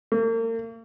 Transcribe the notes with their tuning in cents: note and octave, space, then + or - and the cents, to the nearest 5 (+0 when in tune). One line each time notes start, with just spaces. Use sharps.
A#3 -40